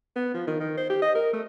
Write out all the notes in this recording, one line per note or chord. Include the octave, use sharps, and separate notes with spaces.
B3
F3
D#3
D#3
C5
G4
D#5
A#4
A3